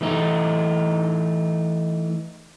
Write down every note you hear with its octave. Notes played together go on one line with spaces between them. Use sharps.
E3 A3 D#4